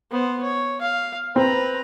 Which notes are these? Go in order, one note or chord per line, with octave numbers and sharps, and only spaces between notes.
B3 C5
C#5
F5
C4 B4 A#5